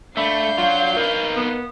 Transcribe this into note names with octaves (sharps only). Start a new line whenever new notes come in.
A3 D4 E5 F5 B5 G6
F#3 F4
D#4 A#4 B4
B3